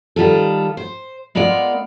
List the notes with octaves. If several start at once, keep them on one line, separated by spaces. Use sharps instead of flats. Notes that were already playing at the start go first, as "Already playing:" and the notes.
D#3 G3 F4 A4
C5
G#3 B3 F4 A#4 D5